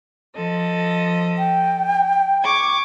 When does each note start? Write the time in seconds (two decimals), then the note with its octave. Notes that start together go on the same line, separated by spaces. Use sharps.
0.36 F3 A4 D#5
1.38 G5
2.43 C#6 D6 G#6